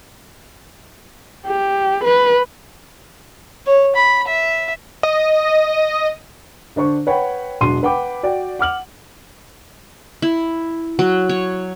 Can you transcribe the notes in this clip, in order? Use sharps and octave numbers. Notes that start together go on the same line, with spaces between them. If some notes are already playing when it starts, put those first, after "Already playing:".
G4
B4
C#5
B5
E5
D#5
D3 D4 C5 C#6
B4 C#5 F#5 G5 B5
E1 F#3 D4 C6 D#7
B4 F#5 G5 B5 D6
F#4 D5 G5
F#5 D6 F6 F#7
E4
F#3
C#5